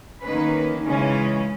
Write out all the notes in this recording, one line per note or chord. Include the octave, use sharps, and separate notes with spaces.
D#3 A#3 C#4 B4
C#3 E3 G#3 C#4